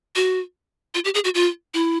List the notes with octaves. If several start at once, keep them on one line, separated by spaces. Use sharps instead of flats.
F#4
F4
G4
G#4
F#4
F4
E4